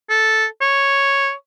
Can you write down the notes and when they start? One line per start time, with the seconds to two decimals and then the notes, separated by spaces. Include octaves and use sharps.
0.10 A4
0.61 C#5